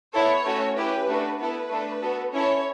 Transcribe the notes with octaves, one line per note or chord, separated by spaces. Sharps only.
B3 E4 A4 C#5
A3 C#4 F#4 A4
C#4 E4 G4 B4
A3 D4 F#4 A4
B3 E4 A4 B4
A3 D4 A4
B3 F#4 A4
C#4 E4 A4 C#5